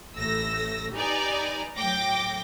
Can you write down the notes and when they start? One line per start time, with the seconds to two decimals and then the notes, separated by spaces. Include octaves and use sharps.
0.17 A1 A3 E6 A#6
0.93 D#4 G4 B4 D5 G#5 A#5
1.76 A2 F#3 G5 D6 A#6